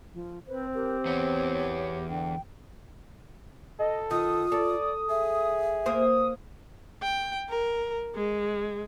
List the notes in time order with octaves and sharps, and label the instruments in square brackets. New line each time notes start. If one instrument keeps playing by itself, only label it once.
[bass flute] F3
[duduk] C4 [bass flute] B4 [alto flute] C5
[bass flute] G4 [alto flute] A#4
[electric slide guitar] E2 B3 [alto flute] C#5
[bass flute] D3 [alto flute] G5
[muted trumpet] A4 [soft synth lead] D#5
[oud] D#3 [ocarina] F4 [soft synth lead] D#6
[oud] A4 [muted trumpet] D5
[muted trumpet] G#4 [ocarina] E5
[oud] A#3 C5 [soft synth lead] D#6
[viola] G5
A#4
G#3